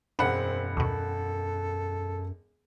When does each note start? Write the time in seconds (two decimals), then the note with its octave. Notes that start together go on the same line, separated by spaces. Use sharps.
0.19 E1 F#2 C4 D4 F#5 B5
0.77 D#2 B2 A4